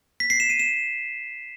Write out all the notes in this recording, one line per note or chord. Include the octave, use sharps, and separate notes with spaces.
B6
C7
E7
D#7
E7